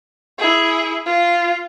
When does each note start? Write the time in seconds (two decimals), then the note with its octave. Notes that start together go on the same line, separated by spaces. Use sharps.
0.38 E4 G#4
1.06 F4